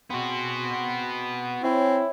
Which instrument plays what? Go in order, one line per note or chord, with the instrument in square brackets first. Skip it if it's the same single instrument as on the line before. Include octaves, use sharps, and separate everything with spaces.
[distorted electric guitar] B3 F#4 [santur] C4 G#4
[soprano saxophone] C4 [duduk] E4 [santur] C#5 E5 G#5